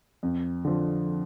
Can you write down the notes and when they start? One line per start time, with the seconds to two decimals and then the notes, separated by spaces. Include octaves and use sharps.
0.23 F2
0.65 D3 F3